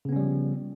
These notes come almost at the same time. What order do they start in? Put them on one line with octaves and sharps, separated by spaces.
C#3 B3 C#4 G3 F3